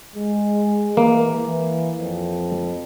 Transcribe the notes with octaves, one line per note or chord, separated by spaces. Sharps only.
G#3
E3 A#3
E3
F2